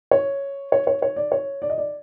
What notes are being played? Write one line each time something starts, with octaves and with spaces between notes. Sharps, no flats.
C#5
C#5
C#5
C#5
D5
C#5
D5
D#5
D5